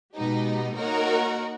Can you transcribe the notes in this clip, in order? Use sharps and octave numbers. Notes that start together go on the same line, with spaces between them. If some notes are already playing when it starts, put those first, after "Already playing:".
B2 G#3 B3 D#4 G4
A#3 D#4 F#4 A#4 C#5